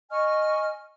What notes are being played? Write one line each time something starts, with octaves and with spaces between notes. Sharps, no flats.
D#5 G#5 C#6 F6